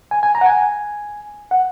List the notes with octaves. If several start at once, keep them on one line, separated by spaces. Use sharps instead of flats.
G#5
G#5
A#5
F#5
G#5
F#5